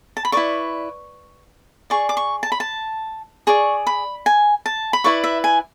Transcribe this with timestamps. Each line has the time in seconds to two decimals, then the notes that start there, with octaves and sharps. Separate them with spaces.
0.17 A5
0.25 B5
0.32 E4 B4 D5 C#6
1.90 G#4 D5 C#6
2.09 D6
2.17 C#6
2.43 A5
2.52 B5
2.60 A5
3.47 G#4 D5 C#6
3.87 B5
4.26 G#5
4.66 A5
4.93 B5
5.04 E4 B4 D5 C#6
5.24 E5
5.44 G#5